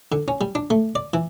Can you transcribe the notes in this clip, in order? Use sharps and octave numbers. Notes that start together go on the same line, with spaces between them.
D3
C#4
G3
D4
A3
D5
E3